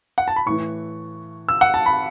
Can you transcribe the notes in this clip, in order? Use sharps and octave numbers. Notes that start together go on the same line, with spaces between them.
F#5
A5
B5
A2 E3 C#6
E6
F#5
A5
B5